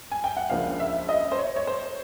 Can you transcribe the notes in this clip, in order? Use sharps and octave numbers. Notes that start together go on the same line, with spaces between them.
G#5
G5
F#5
C#2 C#3 F3 A#3 D4 F5
E5
D#5
C5
C#5
C#5
C5